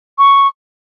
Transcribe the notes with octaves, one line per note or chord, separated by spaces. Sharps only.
C#6